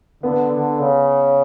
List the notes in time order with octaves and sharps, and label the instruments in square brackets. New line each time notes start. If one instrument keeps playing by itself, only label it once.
[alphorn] D3 [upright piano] B3
[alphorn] D3
C#3